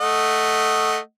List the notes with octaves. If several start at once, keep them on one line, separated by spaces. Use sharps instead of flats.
A3 D#5 F#5